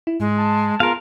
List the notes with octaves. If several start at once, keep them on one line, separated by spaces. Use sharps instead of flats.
E4
G#2 G#3
A5
B3 F4 G#4 A#4 F5